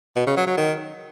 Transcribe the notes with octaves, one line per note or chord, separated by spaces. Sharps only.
B2
C#3
F#3
F#3
D#3